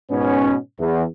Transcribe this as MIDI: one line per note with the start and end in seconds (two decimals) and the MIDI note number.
0.10 0.55 44
0.10 0.55 47
0.10 0.55 59
0.10 0.55 61
0.79 1.03 40